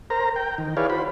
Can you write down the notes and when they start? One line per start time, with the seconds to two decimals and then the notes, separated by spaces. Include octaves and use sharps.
0.10 A#4 C5 A#5
0.36 G5
0.58 D#3
0.77 E4 G#4 B4 C#5 D5 F5
0.90 F#4 C5 B5